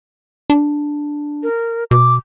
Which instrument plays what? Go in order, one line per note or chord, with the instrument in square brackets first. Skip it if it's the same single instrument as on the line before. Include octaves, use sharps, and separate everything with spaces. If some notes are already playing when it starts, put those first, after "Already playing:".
[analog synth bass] D4
[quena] A#4
[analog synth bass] B2 [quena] D6